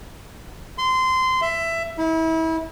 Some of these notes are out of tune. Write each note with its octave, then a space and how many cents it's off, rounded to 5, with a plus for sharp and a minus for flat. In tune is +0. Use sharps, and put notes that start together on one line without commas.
C6 -20
E5 +15
E4 -30